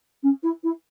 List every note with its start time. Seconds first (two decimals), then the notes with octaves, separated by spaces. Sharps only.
0.23 C#4
0.43 E4
0.63 E4